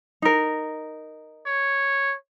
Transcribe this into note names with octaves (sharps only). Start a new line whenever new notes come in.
D#4 A#4
C#5